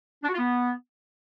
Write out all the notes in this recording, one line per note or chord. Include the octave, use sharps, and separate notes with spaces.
D4
F#4
F4
B3